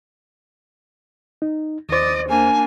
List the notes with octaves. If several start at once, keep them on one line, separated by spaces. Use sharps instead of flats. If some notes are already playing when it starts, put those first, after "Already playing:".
D#4
D#2 C5 D5 D#5
A#3 D4 G#5